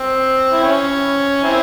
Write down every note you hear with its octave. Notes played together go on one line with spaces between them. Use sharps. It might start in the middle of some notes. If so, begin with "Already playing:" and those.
Already playing: C4
E4
C#4
C4 E4